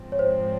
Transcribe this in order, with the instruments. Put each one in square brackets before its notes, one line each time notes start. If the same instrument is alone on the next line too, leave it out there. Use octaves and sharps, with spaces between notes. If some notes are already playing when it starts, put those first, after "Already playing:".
Already playing: [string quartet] G#2 F3 C4
[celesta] C#5
C5